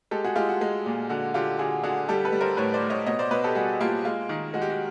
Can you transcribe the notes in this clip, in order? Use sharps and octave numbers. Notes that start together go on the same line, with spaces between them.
G#3 G4 A4
F#4 G#4
G#3 F4 G4
F#4
G#3
A#2
D3 F#4
D3 F4 G4
D3 F#4 G#4
D3 F#4 G#4
G3 G4 A4
A4 B4
G3
A#4 C5
A2 B4 C#5
C5 D5
A2
C#5 D#5
B2 C#5 D#5
C5 D5
B2 B4 C#5
G4 A4
G3 F#4 G#4
A#3 F4 G4
G#3 F4
D#3
G#3 F#4
G4
F#4